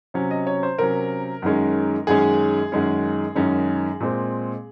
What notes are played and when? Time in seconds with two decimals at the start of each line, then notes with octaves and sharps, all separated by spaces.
0.14 C3 F#3 C#4
0.31 D#5
0.47 C#5
0.63 C5
0.78 C3 F#3 C#4 A#4
1.42 F#2 D#3 G#3 C#4
2.07 F#2 D#3 G#3 C#4 G#4
2.72 F#2 D#3 G#3 C#4
3.35 F#2 D#3 G#3 C#4
4.00 A#2 G#3 C4